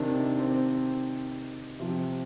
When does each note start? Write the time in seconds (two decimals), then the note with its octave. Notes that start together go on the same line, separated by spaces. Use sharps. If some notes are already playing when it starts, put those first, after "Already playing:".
Already playing: C3 D#3 D4
0.40 C4
1.79 C3 F3